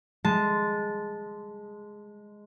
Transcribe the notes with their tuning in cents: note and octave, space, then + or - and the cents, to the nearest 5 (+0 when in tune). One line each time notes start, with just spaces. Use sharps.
G#3 +0 A5 -10